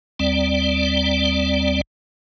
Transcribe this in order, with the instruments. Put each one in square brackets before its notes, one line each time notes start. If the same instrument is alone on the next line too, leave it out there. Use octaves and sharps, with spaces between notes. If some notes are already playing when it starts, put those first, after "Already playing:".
[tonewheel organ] D#2 G3 C4 D5